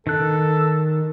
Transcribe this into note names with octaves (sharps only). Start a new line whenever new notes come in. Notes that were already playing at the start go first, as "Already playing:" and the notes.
D#3 A4 F#6